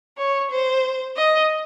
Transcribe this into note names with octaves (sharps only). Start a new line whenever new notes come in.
C#5
C5
D#5